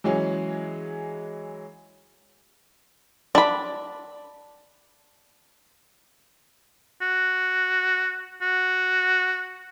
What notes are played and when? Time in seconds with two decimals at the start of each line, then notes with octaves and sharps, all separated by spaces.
0.04 E3 F#3 G#3 C#4 G#4
3.35 D4 B5
7.02 F#4
8.42 F#4